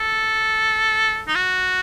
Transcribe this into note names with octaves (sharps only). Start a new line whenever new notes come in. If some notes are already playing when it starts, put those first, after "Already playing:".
Already playing: A4
D#4
F#4